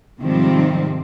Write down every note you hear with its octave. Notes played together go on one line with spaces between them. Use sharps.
G#2 C3 D#3 F3 G3 C4